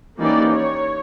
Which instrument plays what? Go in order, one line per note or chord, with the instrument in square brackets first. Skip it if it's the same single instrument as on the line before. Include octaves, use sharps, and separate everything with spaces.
[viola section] E3 A#3 C#4 D#4 G4 D5
C#5